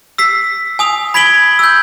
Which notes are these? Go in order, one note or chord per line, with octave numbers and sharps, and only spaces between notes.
E6 B6 C7
G#5 D#6 F7
B5 G#6 B6 D7 F#7 G7
E6 G6